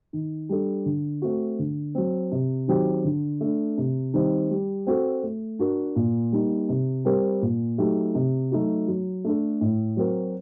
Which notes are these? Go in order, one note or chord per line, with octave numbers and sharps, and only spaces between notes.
D#3
G3 D4 A4
D3
A3 C4 F#4
D3
F#3 C4
C3
D#3 F#3 C4 G4
D3
A3 D4
C3
D#3 G3 C4
G3
C4 F#4 A4
A3
D4 F#4 A#4
A#2
G3 A#3 D#4
C3
G3 C4 G4 A#4
A#2
F#3 A3 D#4 G4
C3
F#3 A3 D#4 F#4
F#3
A3 D4 A4
A2
F#3 C4 F#4 A#4